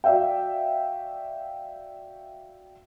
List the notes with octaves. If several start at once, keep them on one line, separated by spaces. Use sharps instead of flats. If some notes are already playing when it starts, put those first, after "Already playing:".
F#4 D5 E5 F5 G5